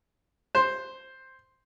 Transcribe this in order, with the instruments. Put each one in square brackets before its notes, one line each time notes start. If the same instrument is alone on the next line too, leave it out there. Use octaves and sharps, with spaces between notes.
[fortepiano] C5